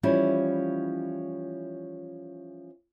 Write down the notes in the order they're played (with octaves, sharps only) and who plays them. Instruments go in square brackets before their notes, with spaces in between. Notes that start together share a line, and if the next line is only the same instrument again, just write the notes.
[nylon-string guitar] E3 F3 G3 C#4 E4